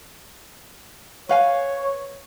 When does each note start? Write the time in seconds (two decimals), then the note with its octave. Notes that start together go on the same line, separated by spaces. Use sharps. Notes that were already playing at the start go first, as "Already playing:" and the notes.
1.29 B4 C#5 F5 G#5